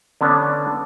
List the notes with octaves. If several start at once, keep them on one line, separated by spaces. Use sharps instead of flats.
D3 B3 C#4 D4